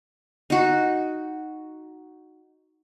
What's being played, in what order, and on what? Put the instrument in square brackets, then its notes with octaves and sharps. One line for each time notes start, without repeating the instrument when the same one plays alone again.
[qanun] D#4 F#4